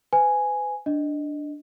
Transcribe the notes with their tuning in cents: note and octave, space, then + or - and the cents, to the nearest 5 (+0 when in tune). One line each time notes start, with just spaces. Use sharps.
B4 +40 G#5 +0
D4 +0 D#5 +0